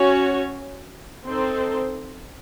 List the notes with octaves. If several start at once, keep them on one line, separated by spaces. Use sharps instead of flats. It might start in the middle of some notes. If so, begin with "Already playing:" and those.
Already playing: C#4 F#4 C#5
C4 D#4 A4 C5